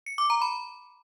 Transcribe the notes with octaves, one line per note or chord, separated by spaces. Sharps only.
C#7
D6
A#5
B5